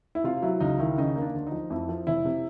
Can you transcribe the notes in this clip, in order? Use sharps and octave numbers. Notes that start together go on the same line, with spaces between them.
E4
C3 F4
F#3 E4
C#2 D#4
D#3 E4
C#3 D#4
A#3
D4
D2
D#4
F3
F2 E4
F3
F1 E4
C3